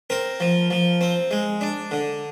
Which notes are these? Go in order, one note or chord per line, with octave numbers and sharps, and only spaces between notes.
C4 A#4
F3
F3
C4
G#3
D4
D3